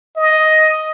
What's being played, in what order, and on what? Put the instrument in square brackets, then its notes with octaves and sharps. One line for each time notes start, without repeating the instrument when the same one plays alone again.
[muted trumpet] D#5